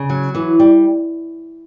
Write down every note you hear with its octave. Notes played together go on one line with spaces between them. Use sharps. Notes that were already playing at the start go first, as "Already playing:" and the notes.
Already playing: C#3
F#3
E3
G3